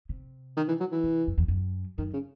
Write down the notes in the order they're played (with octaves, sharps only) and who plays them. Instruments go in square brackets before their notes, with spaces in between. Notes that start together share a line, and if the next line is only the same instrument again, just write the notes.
[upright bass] C3
[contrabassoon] D#3
E3
F#3
E3
[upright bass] C3
F#2
E2
F#2
[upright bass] F#2 [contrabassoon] D#3
[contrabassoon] C#3